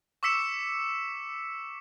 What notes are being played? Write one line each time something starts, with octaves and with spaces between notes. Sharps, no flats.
C#6 D6 E6 B6 C#7 E7